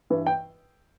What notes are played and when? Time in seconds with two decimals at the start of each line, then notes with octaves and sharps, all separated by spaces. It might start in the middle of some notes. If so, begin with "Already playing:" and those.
0.10 G2 E3
0.27 G5